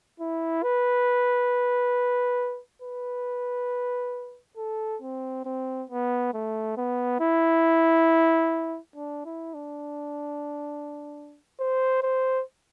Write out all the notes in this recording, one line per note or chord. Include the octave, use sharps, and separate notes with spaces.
E4
B4
B4
A4
C4
C4
B3
A3
B3
E4
D4
E4
D4
C5
C5